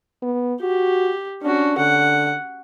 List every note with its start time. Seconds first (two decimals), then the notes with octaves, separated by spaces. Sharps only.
0.22 B3
0.61 F#4 G4
1.42 C#4 D4 F#4
1.78 D3 F#5